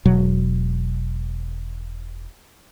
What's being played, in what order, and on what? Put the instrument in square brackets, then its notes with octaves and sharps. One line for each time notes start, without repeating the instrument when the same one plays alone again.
[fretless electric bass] E1 B2 F#3